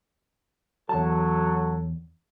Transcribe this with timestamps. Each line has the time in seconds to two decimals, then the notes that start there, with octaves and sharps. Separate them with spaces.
0.89 E2 F#3 A4 A5